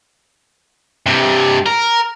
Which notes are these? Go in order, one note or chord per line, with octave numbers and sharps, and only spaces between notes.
G2 C3
A#4